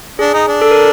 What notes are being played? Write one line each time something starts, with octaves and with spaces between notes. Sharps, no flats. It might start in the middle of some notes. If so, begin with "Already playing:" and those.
D4 G#4
D#4
D4
A4
A#4